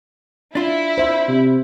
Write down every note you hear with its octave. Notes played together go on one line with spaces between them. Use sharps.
D4 E4 F4
C5 E5
C3